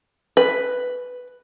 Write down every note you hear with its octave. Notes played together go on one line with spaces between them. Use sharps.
B4